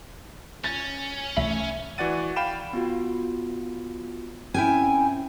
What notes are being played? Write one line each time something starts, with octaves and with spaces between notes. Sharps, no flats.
C#4 A6
C2 E3 A3 E5 B5
E3 F#4 D5 F#5 A6 D#7
F5 G5 B5 E7
B3 F4 F#4
C4 C#4 E4 G5 G#5